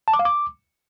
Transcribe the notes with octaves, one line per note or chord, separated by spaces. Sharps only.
A5
D6
F5
D6